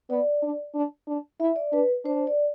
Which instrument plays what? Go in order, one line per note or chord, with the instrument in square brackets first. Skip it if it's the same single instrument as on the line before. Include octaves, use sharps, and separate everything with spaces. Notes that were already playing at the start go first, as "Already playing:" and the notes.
[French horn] B3 [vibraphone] D5
[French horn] D4
D4
D4
[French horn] E4 [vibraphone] E5
[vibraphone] D5
[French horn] D4 [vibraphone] B4
[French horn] D4 [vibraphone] C5
[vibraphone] D5